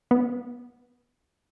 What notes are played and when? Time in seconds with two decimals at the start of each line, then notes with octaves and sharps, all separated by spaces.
0.11 B3